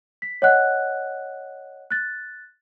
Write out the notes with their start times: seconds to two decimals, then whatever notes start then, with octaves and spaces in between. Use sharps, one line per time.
0.22 B6
0.42 C#5 D#5 F#5 F#6
1.91 F#6 A6